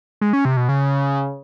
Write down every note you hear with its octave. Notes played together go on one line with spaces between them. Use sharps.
G#3
C#4
C3
B2
C#3